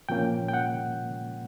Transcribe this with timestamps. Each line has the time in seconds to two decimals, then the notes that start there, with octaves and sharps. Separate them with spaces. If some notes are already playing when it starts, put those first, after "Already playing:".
0.09 A#2 F3 A#3 C#4 G5
0.48 G5
0.54 F#5